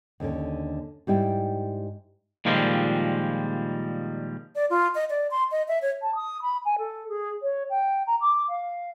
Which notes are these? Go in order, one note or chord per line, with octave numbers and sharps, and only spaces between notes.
D#2 D3 C#4
G#2 G3 E4 G5
A#2 D#3 F3 G3 G#3
D5
F4
D#5
D5
C6
D#5
E5
C#5
A5
D#6
B5
G#5
A4
G#4
C#5
G5
A#5
D6
F5